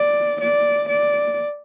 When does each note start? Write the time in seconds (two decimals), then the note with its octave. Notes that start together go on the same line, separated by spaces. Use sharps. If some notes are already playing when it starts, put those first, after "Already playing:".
Already playing: D5
0.40 D5
0.88 D5